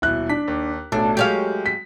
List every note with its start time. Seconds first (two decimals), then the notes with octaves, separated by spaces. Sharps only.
0.02 D#1 B2 E4 F#6
0.29 D4 B6
0.48 D#2
0.92 A1 B2 A3 D4
1.17 F#3 G#3 G4 C#5 F5
1.66 B6